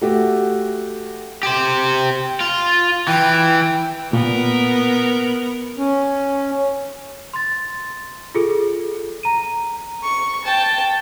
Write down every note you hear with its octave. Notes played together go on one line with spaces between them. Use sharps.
A3 F#4 G4
G4 C5
F4
E3 G5
A#2 B3 A#4
C#4
C6 A6
F4 G#4 A4
A#5 D#7
C#6
G5 A5